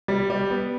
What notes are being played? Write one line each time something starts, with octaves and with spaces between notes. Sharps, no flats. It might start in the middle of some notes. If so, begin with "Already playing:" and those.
G3
G3
B3